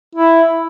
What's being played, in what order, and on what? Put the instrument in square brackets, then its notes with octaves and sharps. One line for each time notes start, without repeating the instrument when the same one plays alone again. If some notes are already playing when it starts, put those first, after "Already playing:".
[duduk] E4